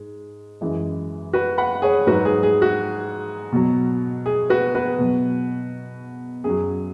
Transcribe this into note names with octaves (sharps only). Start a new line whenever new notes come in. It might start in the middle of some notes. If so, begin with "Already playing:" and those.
Already playing: G#2 G#3
F#2 E3 G#3
F#4 B4
F#5 B5
G#4 C#5
G#2 F#3 F#4 B4
G#4
G#4
F#4
B2 F#3
G#4
F#4 B4
F#4 B4
B2 F#3
F#2 F#3 G#4